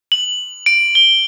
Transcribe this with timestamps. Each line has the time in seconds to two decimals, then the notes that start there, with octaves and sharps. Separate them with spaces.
0.12 F#7
0.66 D7
0.95 G7